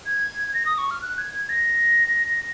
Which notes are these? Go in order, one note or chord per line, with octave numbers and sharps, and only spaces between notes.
G#6
A#6
D#6
C#6
F6
F#6
G#6
G#6
A#6